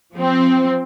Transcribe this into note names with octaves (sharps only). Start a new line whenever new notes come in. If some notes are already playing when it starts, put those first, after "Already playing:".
F3 C4